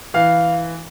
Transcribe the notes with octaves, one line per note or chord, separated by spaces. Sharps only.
E3 F5